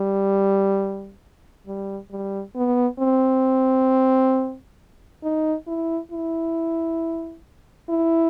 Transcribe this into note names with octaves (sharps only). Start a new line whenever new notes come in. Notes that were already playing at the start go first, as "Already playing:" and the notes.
Already playing: G3
G3
G3
B3
C4
D#4
E4
E4
E4